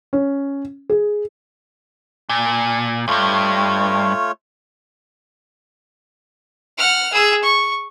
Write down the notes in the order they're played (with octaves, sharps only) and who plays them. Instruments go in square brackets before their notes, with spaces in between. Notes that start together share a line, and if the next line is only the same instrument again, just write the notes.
[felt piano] C#4
G#4
[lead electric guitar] A#2 [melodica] A5
[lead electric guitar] E2 G2 [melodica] A3 F4 C#5
[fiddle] F#5 F6
G#4 E6
C#6